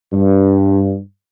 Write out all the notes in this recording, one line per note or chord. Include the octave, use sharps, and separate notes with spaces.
G2